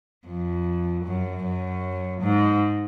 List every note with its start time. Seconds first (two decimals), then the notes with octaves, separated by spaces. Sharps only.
0.28 F2
1.05 F#2
1.44 F#2
2.22 G#2